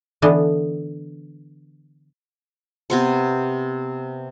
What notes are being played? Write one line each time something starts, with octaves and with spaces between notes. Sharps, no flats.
D3 E3 B3 D4 D#5 A5
C3 B3 C5